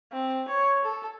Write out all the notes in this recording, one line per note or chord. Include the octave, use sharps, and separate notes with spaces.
C4
C#5
A4